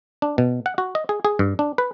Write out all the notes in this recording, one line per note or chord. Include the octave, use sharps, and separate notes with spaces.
D4
B2
F#5
F#4
D#5
G#4
G#4
G2
D4
B4